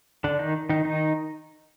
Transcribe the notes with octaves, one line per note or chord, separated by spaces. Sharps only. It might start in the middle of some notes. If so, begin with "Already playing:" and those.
D3 D4
D#3 D#4
D#3 D#4
D#3 D#4